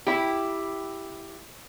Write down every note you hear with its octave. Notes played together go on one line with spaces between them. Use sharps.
E4 G4